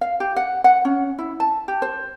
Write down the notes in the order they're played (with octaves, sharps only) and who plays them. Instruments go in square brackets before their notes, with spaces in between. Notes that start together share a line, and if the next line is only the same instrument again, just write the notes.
[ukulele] F5
G4
F#5
F#5
C#4
E4
A5
G4
C5